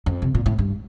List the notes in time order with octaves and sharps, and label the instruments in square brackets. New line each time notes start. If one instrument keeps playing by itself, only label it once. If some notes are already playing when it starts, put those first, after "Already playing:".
[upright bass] F2
C3
A#2
A2
G2